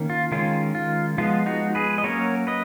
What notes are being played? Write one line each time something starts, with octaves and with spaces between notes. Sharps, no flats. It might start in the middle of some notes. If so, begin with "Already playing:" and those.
Already playing: D#3 A#3 C#4
F4
D#3 G#3 C#4 F4
F4
F3 G#3 B3 F4
D#4 F#4
G#4 B4
D#5
F#3 A#3 C#4 A#4 C#5
B4 D#5